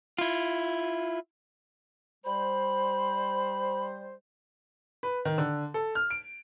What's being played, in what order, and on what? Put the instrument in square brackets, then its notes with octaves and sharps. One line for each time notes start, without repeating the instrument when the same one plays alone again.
[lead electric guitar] E4 F4
[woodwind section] G3 C5 [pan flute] B5
[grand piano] B4
D#3
D3
A4
F6
D7